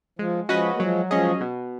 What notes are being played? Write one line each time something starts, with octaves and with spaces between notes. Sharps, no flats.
F3 G#3
F3 G#3 C#4 F#4 B4 D#5
A#3
F3 F#3 G#3
F3 G#3 C#4 G#4 D#5
B2